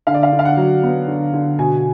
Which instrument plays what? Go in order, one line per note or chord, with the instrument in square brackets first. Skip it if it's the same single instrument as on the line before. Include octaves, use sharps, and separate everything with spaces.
[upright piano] D3 F5
D5
F5
D3
F5
F#5
F#3
B3
D3
D3
B2 G#5